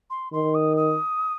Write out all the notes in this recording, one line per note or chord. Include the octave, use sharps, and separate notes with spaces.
C6
D#3 C6
D#6
D#6